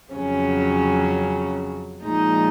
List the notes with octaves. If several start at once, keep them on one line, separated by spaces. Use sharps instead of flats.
F2 C#3 F#3 C#4
A#2 F3 G#3 D#4